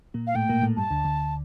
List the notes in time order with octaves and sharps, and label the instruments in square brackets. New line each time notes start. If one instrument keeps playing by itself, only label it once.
[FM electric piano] A#2 A#3
[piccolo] F5
[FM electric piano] A2 A3 [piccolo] G5
[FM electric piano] A#2 A#3
A2 A3
[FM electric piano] G2 G3 [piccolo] A5
[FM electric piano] D2 D3
D2 D3